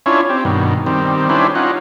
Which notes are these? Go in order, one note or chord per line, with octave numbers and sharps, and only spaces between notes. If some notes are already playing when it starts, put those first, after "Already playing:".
C#4 D4 E4 F4 C#5
C4 G4
G2 B2 D#3
D#3 G3 C4
C#4 D4 E4 G4 B4 C5
C#4 D#4 F4 F#5